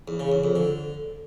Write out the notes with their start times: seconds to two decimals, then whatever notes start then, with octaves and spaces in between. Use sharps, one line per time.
0.08 E2
0.20 C#3
0.32 E2
0.44 F2
0.56 D3